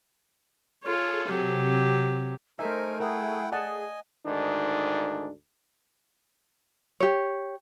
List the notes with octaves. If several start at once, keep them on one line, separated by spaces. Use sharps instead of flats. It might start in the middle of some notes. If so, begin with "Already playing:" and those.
F4 G#4 A4 C#5
C3 F#3 G4
A3 D#4 A#4 C5 E5 G#5
E4 G#4 A#4 F#5 G5
G#4 D5 D#5 F#5 G#5 A5
D2 G#2 D#3 D4
G4 C#5